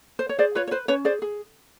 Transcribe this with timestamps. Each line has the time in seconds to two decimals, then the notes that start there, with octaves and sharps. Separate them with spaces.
0.19 C5
0.29 C#5
0.39 G#4 C5 D5
0.55 F4 B4 C#5
0.67 C#5
0.71 B4 C5
0.88 C#4 B4 C#5
1.05 G#4 C5 D5
1.22 G#4